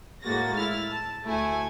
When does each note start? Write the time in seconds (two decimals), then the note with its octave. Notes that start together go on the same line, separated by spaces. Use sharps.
0.24 A2 G#3 A#3 F#4 A6 A#6
0.55 E4 F6 A6
0.88 A5
1.25 D2 A3 E4 G#5